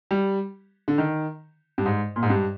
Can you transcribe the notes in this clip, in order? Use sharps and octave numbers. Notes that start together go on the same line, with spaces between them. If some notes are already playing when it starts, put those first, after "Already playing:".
G3
D3
D#3
G2
G#2
A#2
G#2
G2